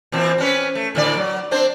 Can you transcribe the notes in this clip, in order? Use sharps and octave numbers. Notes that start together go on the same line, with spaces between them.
A#2 E3 C4
C4 C#4 B4
A3
A2 D3 D5
F#3
C4 D4 C5